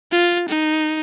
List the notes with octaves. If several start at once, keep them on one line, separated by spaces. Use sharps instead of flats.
F4
D#4